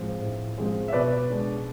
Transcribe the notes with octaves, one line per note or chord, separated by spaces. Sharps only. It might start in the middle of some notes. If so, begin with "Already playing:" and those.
Already playing: A2 F3 G#3 C4
A2
F3 G#3 C4
E5
B2 B4 D5
G#3 D4